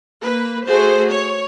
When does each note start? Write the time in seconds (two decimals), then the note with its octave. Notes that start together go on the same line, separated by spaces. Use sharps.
0.23 A#3 B4
0.66 A3 F#4 G#4 C5
1.10 C#5